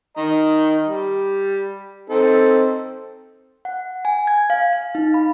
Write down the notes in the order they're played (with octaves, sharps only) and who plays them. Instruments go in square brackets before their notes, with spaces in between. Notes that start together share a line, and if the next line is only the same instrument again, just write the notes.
[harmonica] D#3 D#5 A#5
G3
C4 D#4 A4
[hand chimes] F#5
G#5
G#6
F5
F5
D#4
B5